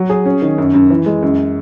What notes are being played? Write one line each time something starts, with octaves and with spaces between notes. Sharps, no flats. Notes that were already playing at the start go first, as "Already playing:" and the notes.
Already playing: F#3
G#4
C#4
D#3
F#2
F#2
E3
G#3
F#2